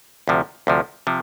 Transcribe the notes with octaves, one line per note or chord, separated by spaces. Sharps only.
D2 C3 F3
D2 C3 F3
C3 F3